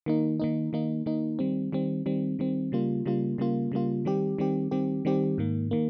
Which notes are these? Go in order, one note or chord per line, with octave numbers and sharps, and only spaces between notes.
D#3 A#3 D#4
D#3 A#3 D#4
D#3 A#3 D#4
D#3 A#3 D#4
D#3 G3 C4
D#3 G3 C4
D#3 G3 C4
D#3 G3 C4
C#3 G3 A#3 F4
C#3 G3 A#3 F4
C#3 G3 A#3 F4
C#3 G3 A#3 F4
D#3 G3 C4 G4
D#3 G3 C4 G4
D#3 G3 C4 G4
D#3 G3 C4 G4
G#2 D#3 A#3
D#3 A#3